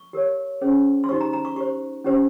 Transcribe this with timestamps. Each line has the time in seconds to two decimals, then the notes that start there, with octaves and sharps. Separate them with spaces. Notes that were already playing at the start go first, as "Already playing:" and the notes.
Already playing: C#6
0.13 G4 A#4 C#5
0.61 C#4 G#4 C5
1.04 C6
1.09 D#4 G4 C5 C#6
1.21 A#5
1.33 A#5
1.45 C#6
1.56 G4 C5 C#6
2.04 C#4 G4 C5